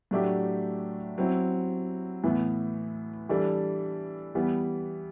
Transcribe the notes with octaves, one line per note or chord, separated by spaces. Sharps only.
A2 F#3 A3 D4 G4
F#3 C4 E4
A2 E3 B3
E3 G3 D4 A4
E3 G3 B3